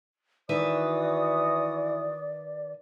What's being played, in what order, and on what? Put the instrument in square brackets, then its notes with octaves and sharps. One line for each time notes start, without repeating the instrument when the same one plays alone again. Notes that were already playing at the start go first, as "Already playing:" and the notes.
[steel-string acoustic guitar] D#3 B4 E5 [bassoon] E3 [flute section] F#4 D#6 [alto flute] D5